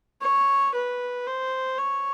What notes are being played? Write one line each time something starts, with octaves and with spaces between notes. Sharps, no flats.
C#5
B4
C5
C#5